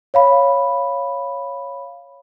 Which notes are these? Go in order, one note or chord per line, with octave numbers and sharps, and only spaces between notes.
C#5 F5 B5